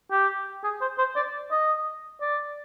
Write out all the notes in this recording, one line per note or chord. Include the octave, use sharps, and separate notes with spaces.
G4
G#4
C5
C5
D5
D#5
D5